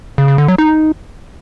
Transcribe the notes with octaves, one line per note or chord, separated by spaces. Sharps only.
C#3
C#3
D3
F#3
D#4